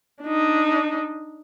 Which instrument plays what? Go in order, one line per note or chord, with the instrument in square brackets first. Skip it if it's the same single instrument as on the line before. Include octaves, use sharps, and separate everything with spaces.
[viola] D4 D#4